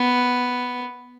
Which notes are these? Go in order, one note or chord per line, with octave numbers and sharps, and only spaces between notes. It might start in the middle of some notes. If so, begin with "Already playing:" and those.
Already playing: B3